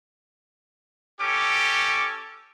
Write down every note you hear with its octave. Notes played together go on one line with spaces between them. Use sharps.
C#4 G4 A4 D6